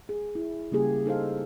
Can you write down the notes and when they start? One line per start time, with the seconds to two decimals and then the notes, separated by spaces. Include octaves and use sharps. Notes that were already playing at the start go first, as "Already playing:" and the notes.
0.09 G#4
0.35 E4
0.72 C#3 G3 A#3 G4 G#4
1.06 D#4 A4 C5 F5